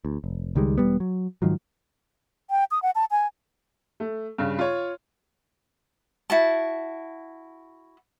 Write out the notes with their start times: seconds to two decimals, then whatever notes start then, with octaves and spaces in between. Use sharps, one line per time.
0.05 D2
0.24 F1
0.56 C#2 D#3 G3 G#3
0.78 E1 G3 B3
1.00 F#3
1.42 G#2 D#3 F3 F#3
2.50 G5
2.71 D#6
2.83 F#5
2.95 A5
3.11 G#5
4.00 A3
4.38 G2 C#3
4.59 F4 C#5
6.30 E4 F#4 A5